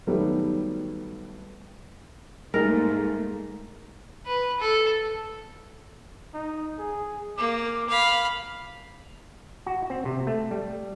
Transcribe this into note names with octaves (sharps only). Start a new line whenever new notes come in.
D#3 F#3 G3 A3 B3
G#2 G3 A3 A#3 D#4 G#4 A#4
B4
A4
D#4
G#4
A#3 D6
F5 B5
F#4
C4
C3
A3
G3